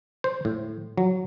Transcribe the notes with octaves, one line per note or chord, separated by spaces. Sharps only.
C5
A2
F#3